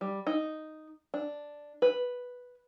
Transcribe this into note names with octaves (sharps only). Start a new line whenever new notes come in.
G3
D#4
D4
B4